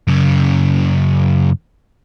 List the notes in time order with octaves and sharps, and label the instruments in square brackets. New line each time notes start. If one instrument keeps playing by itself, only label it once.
[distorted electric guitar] F#2 C#3